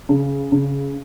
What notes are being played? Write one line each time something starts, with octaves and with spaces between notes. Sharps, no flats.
C#3
C#3